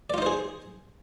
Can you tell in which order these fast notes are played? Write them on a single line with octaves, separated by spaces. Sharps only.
D5 F4 D#4 C5 G#4